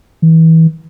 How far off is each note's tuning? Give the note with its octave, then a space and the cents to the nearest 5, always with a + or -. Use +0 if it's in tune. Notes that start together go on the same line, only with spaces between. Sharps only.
E3 -30